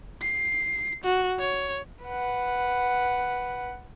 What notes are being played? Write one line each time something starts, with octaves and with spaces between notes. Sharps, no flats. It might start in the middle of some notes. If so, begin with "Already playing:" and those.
C7
F#4
C#5
B4 F#5